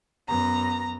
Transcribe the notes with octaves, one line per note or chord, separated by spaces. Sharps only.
F#2 B3 A#5